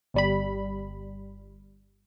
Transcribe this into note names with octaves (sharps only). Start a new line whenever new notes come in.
G1 G3 B5